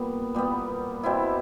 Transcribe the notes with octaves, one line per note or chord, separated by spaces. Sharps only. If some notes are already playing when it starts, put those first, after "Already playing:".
Already playing: A#2 G3 B3
A#2 G3 B3
B2 G3 C4 E4